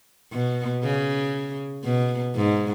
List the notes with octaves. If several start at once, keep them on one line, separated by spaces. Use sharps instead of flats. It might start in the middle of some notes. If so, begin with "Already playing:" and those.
B2
C#3
B2
G#2